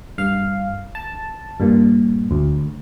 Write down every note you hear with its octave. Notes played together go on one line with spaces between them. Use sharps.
G2 F5
A5
G2 A#2
D2